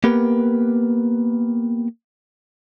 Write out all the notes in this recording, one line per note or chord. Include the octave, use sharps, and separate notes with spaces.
A#3 B3 G4 A#4 B4